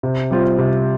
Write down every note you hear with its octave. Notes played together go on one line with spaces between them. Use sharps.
C3
G3 C4 F4
C3